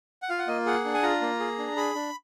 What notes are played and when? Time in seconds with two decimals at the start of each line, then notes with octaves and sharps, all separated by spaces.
0.22 F#5
0.29 F4 F5
0.39 F#5
0.48 A#3 D#5
0.66 G#4 F#5
0.85 D4
0.94 G#5
1.03 F4 A#5
1.21 A#3
1.40 G#4
1.59 D4
1.77 G#4 B5
1.95 D4